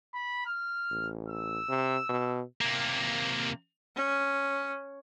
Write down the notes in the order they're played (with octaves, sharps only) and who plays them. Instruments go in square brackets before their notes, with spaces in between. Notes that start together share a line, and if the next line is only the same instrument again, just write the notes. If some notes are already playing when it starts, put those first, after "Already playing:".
[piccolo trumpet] B5
F6
[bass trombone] A1
[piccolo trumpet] E6
[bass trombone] C3
B2
[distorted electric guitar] C3 A#3
[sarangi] C#4